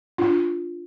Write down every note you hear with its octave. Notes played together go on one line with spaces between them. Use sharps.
D4 F4